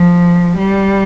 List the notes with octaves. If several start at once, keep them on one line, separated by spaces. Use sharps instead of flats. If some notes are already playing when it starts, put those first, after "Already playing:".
Already playing: F3
G3